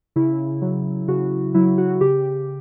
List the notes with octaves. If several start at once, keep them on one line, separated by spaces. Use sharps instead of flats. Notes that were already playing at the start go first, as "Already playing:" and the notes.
C#3 E4
F#3
C#3 F#4
F#3 E4
F#4
C#3 G4